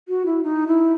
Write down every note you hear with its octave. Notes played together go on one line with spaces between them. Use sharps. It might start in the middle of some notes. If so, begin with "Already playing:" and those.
F#4
E4
D#4
E4